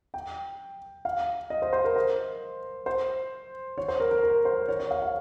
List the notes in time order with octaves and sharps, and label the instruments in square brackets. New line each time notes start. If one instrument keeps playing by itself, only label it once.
[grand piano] G5
F5
D#5
C5
C5
A#4
C5
C5
C#5
C5
A#4
A#4
A#4
C5
C#5
C#5
F5
F5